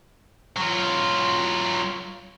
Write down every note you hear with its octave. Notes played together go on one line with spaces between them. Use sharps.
F#3 F4